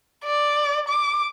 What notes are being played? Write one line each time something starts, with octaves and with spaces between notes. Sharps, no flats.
D5
D6